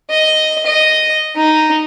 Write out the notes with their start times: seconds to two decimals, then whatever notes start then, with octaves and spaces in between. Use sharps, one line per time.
0.11 D#5
0.66 D#5
1.36 D#4